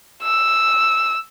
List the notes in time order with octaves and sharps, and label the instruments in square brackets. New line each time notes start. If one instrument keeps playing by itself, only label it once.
[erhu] E6